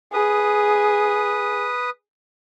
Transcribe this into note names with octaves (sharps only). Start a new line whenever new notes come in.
G#4 B4 D#6